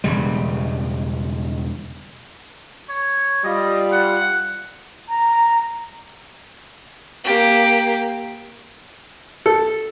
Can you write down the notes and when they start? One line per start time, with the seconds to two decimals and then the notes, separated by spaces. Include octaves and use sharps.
0.04 E1 C#3 G3
2.89 C#5
3.44 G3 F4 D#5
3.92 F#5
5.08 A#5
7.24 A#3 G4
9.46 A4